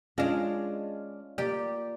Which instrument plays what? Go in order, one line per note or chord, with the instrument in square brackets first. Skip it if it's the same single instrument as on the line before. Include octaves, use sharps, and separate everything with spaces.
[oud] G#3 D4 [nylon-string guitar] C#4 [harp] F4 F5
[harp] A#3 D5 [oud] G4